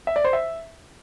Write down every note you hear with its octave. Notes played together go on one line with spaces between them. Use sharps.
E5
D5
C5
E5